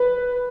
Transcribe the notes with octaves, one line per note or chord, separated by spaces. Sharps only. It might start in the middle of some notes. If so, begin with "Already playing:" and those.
Already playing: B4